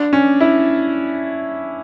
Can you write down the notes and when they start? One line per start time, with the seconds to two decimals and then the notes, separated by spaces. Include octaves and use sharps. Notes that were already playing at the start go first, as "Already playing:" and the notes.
Already playing: D4
0.13 C#4
0.41 E4